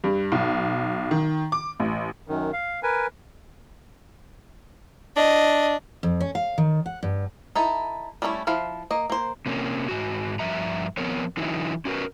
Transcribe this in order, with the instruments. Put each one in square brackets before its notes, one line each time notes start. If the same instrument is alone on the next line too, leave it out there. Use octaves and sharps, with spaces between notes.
[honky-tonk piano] G2
B1
D#3
D6
A1
[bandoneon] F#2 D#3
F5
A#4 B4 G#5
[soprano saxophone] D4 [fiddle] D#5
[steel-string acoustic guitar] F2
C#4
F5
D#3
F#5
G2
[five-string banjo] D#4 E4 A4
G3 A3 C#4 D#4 E4
F3 E4 F5
A#3 D#5
A#3 C5
[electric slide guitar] C3 A#3 C#4
G#2 F#4
G2 F3 E5 A#5
F3 B3 C4 A#4 C#5
D3 E3 F#3 D#4 E4
C#4 F#4 G4 A#4 B4